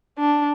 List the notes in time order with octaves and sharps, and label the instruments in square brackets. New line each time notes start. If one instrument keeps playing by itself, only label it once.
[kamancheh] D4